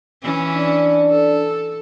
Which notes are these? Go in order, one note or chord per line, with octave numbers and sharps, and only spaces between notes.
E3 C#4
D4
A4